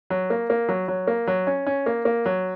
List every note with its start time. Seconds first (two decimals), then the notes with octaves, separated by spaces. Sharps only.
0.10 F#3
0.30 A#3
0.50 A#3
0.69 F#3
0.88 F#3
1.07 A#3
1.27 F#3
1.47 C#4
1.67 C#4
1.86 A#3
2.05 A#3
2.26 F#3